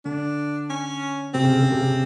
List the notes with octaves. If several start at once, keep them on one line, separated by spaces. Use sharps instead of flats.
D3 D4
C#4
C3 C4
C#3
C3
C#3
C3